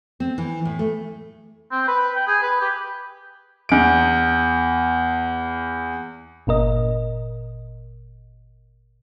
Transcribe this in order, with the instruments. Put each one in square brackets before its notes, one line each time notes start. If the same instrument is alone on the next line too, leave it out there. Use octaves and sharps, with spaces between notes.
[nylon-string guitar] C4
E3
A2
A3
[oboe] C4
B4
G5
G#4
B4
G4
[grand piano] E2 D7
[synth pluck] G1 A#2 A#4 D#5